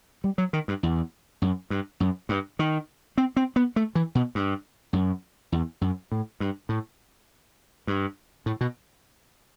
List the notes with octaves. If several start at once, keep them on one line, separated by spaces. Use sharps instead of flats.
G3
F#3
D#3
G2
E2
F#2
G2
F#2
G2
D#3
C4
C4
B3
A3
E3
B2
G2
F#2
E2
F#2
A2
G2
A2
G2
A2
B2